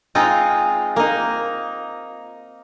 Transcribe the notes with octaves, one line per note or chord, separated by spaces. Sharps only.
G#3 C4 D#4 F4
A#3 D#4